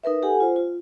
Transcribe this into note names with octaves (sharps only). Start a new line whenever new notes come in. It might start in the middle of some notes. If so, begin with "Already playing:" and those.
D#4 A#4 B4 E5
G4 A4 F#5 G#5
F4 C5
F4